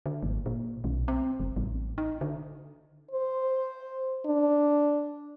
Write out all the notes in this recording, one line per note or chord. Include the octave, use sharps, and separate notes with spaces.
D3
G#1
A#2
B1
C4
F#1
A1
D#4
D3
C5
D4